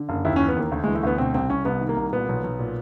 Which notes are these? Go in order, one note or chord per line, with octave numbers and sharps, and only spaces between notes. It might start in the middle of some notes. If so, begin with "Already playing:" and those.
Already playing: D3
F#1
D#2 E4
C#4
E3
B3
D#2 A#3
D2 A3
G#3
E3
A3
D2 B3
B2 C4
C2 C4
C2 C#4
C2 B3
D#3
A#3
C2
A#2 B3
B1
B1
A#2